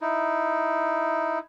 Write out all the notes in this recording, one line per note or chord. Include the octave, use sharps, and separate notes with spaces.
D#4 E4